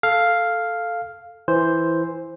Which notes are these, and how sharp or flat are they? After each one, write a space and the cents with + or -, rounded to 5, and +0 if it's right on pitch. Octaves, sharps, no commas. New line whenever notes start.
A4 +0 F5 +0
E3 +0 C5 +0